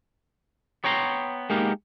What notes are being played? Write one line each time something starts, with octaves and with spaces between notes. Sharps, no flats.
B3 C#5 G5 A#5 C6
G#3 A#3 B3 D#4 G4 A#4